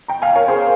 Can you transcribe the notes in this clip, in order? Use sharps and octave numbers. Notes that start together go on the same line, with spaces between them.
G5 A#5
F5 G#5
A#4 C#5
G#4 C5